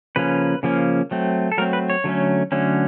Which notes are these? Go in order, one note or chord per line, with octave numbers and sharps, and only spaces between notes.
C#3 F3 A#3 C#4 B4
C#3 F3 A#3 C#4
F#3 A3 C4
A4
F#3 A3 C4 A#4
B4
C#5
D3 F#3 A3 C#4
D3 F#3 A3 C#4